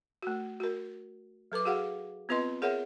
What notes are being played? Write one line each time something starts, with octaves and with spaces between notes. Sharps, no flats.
A3 F#4
F#4 A#4
F#3 A4 B4 D6
F#4 G#4 F5 F#5
B3 C4 F4 B4 D#5 C6
G#4 A#4 C#5 E5 F#5